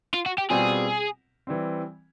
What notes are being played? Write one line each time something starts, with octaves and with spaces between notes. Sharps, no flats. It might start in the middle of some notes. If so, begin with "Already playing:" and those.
F4
F#4
G4
B2 G3 C4 F4 G#4
E3 G3 C4